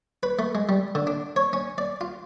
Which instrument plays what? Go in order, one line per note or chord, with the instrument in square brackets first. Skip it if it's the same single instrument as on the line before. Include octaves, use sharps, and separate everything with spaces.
[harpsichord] B4
A3
G#3
G3
D3
D4
C#5
C#4
D5
F4